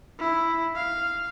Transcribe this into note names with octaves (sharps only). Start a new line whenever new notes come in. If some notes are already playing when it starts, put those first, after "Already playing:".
E4
F5